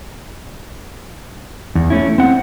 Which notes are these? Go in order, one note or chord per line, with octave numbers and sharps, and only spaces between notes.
E2
A3 C#4 E4
C4 F#5